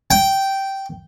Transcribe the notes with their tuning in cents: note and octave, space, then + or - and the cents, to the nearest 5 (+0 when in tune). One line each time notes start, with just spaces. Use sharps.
G5 -10